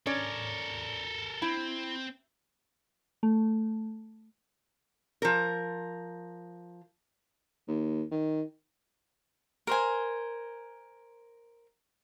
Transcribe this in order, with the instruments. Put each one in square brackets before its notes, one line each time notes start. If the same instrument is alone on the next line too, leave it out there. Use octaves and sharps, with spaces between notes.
[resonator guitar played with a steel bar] C#4 C#5 D5 [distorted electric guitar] A4 A#4
[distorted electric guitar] C4 [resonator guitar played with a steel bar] E4
[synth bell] A3
[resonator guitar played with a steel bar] F3 A#4
[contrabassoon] D#2
D#3
[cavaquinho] A#4 C5 G#5